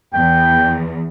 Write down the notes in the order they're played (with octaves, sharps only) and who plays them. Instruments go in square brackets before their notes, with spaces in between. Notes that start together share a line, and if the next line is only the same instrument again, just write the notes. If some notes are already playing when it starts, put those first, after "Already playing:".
[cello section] E2 [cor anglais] G5